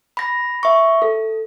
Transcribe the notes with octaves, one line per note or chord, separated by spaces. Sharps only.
B5 A#6
E5 C#6
A4